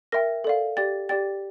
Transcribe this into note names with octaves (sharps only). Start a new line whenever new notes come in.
A#4 E5 G5 A#6
A4 D5 F5
G4 D5 G5 A6
G4 D5 G5 A6